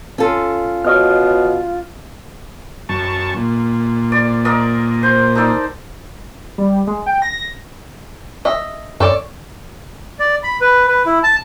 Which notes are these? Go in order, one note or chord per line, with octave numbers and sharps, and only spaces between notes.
C#4 F4 A4
B2 C#5 D#5 F6
F#2 A5 C#6
A#2
D5
A#4 D5 D#5
C5
D#4 A4 D5
G3
G#3
G5
A#6
D#5 E5
F#2 A4 C#5 D5
D5
B5
B4
B4
E4
A5